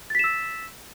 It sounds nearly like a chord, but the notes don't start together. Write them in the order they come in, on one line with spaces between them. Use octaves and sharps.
A6 B6 E7 E6